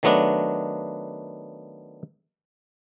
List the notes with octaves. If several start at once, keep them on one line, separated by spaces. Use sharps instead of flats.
D#3 F#3 A3 B3 D4